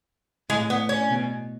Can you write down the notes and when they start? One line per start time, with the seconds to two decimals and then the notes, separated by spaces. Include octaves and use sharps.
0.49 A2 G#3
0.70 B3
0.89 C#4
1.11 B2